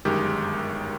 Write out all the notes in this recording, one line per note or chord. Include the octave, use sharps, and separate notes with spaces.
G1 F#2 D#3 G#3 G4